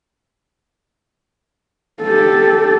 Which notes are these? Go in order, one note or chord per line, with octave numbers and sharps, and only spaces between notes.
G4 A4